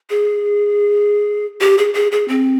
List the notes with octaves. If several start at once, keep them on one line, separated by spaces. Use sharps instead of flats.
G#4
G4
G#4
G#4
G#4
C4